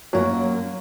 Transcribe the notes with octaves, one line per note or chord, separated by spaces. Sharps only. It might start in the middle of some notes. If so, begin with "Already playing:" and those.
F#2 F#3 A#3 C#4